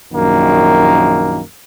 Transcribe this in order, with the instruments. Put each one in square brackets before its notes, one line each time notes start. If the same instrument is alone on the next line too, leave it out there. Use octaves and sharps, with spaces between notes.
[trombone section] A#1 F#2 D#3 A#3